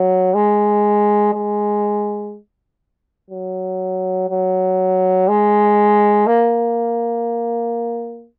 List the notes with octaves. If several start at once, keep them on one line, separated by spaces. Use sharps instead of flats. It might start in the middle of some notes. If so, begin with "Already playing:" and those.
Already playing: F#3
G#3
G#3
F#3
F#3
G#3
A#3